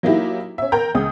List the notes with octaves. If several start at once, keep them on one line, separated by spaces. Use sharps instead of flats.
F#3 A#3 D#4 E4 G4
C#4 E5
A#4 G5 A#5 G6
C#2 D#6